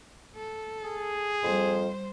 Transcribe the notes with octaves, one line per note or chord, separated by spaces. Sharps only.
A4
G#4
F2 G3 C5